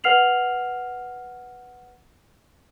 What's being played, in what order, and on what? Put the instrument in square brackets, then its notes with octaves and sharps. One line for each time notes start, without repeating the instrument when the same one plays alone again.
[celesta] B4 F#5 F6 C7 F7 F#7